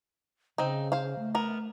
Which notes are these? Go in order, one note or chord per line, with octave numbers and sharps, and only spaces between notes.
C#3 C4 D#4
C5 F5
A3
B3 A#4